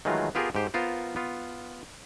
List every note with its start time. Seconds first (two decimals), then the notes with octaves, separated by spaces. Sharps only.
0.05 D#3 E3 F#3 G#3 A3 F4
0.35 B3 F4 G4 G#4 A#4
0.55 G#2 G4 C5
0.74 B3 F4 A#4 C5
1.16 B3 F4